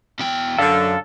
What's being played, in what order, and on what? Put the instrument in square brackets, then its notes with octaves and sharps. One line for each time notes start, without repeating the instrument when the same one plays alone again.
[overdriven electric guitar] E2 G5
[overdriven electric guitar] F#2 [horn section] D3 [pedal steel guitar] A4 [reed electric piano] F5